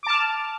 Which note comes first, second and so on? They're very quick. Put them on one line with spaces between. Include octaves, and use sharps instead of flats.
D6 A5 F6